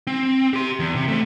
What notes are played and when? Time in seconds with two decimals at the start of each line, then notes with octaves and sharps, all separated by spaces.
0.07 C4
0.53 G4 C6
0.80 E2
0.95 C3
1.08 A3 C5